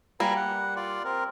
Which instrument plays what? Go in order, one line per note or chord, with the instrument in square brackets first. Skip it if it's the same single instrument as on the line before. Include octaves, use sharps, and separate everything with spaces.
[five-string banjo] G3 A#3 [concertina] B4 G#5 A#5
[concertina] F#5
F4 D5
C4 A#4